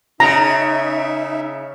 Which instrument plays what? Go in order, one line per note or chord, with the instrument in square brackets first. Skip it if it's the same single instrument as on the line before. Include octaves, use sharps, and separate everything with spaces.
[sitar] C#3 [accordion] D#4 E5 [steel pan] A#5